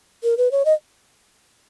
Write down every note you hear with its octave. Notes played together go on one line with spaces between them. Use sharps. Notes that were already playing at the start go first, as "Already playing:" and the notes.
A#4
B4
C#5
D#5